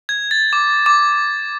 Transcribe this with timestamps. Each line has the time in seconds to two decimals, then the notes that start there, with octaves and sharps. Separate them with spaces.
0.09 G#6
0.31 A6
0.53 D6
0.86 D6